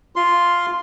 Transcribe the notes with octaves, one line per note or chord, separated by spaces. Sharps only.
F4 C6